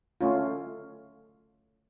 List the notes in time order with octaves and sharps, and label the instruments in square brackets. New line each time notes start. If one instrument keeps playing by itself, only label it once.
[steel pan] A3 C#4 F4